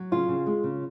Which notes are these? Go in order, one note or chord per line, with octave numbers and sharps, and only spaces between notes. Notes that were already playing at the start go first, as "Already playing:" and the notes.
Already playing: F#3
C#3 F4
C#3
G#3
C#3